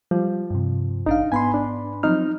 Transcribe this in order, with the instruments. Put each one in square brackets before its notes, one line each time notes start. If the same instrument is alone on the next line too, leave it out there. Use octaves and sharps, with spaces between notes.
[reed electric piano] F3 [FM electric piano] G3
[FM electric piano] G2 C3
[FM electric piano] A1 D4 F5 [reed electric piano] D#4
[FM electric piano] G#2 B3 B5 [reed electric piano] G#5 C6
[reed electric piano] D4
[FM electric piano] F3 F#3 C4 [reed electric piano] D#4 F6